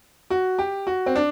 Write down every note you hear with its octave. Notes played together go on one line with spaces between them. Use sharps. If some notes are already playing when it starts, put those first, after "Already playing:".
F#4
G4
F#4
C4
D4